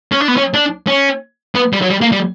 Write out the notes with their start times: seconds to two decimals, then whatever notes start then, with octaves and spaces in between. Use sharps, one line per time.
0.12 C#4
0.21 D4
0.28 B3
0.37 C#4
0.54 D4
0.87 C#4
1.55 B3
1.73 G3
1.82 F#3
1.90 G3
2.01 A#3
2.12 G3